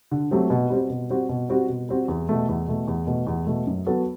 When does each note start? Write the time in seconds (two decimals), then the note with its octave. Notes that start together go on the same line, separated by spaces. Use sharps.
0.11 D3
0.31 F#3 A3 C4 G4
0.50 B2
0.70 G3 C4 F#4
0.90 B2
1.10 G3 C4 F#4
1.29 B2
1.49 G3 C4 F#4
1.69 B2
1.89 G3 C4 F#4
2.08 E2
2.29 B2 A3
2.49 E2
2.67 B2 A3
2.88 E2
3.07 B2 A3
3.27 E2
3.47 B2 A3
3.67 F#2
3.86 F#3 B3 F#4 A4